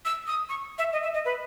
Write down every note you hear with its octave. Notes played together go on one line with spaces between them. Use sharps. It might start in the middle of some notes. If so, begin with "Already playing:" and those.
E6
D#6
C#6
E5
D#5
E5
D#5
B4